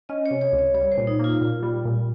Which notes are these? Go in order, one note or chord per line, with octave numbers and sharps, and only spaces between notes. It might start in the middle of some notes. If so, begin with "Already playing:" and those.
C#4 D#5
C#5
C3
C#5
C#2
C#5
G3 C#5
C5
A#2
D#4
A#3 F4
A#2
G3
A#2